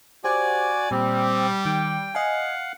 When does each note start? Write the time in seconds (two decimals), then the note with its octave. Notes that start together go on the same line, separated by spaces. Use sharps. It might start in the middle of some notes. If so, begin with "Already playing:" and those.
0.24 F#4 G4 C5 D5 F#5 G#5
0.91 A#2 G3 C4
1.65 D#3 G5
2.15 D#5 F5 F#5 G#5